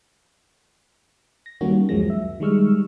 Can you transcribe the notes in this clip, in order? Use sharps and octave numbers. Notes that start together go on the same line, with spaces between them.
A#6
D#3 G3 A#3 C#4 F#4 C#5
C#2 F#2 F3 F#3 G#3 A#6
E5
D#3 G3 G#3 C#6 E6 F6